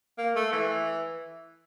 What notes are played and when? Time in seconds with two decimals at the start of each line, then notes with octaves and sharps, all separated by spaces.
0.18 A#3
0.36 A3
0.52 E3